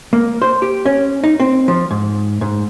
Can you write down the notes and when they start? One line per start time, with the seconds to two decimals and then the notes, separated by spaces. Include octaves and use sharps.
0.13 A#3
0.42 C5
0.62 G4
0.85 C#4
1.24 D#4
1.40 C4
1.68 F3
1.91 G#2
2.41 G#2